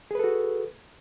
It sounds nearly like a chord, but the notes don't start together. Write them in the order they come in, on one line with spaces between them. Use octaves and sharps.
G#4 B4 A4 F#4